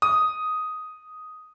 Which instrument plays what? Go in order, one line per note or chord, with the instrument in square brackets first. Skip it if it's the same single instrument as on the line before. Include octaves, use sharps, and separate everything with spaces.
[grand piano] D#6